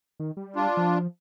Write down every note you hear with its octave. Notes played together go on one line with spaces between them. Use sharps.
D#3
G3
D4 F4
F3